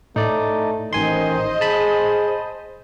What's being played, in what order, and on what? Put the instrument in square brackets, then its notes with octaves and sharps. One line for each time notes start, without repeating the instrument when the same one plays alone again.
[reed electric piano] A2 [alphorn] A3 [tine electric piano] D#4 D5
[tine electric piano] A1 G#5 C6 [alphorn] D#3 [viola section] C5 D#5
[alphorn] G#4 [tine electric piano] A5 B5